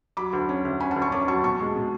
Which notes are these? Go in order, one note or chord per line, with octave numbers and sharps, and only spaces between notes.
F#3 B5 D6
D2
C#4
D2
C#4 G#5 B5
F#5 A5
D2
A5 C#6
C#4 B5 D6
F#3 A5 C#6
B2 A5 C#6
G#3
B2